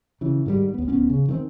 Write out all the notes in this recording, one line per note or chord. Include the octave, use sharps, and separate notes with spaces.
C#3 E3
G#2 D#3 F3 G3
D#2 B3
D1 B3 C#4
C#3
D#3 E3 G#3 C4